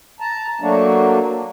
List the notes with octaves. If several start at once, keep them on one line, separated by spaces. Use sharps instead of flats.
A5 A#5
F#3 A3 A#3 D4 F#4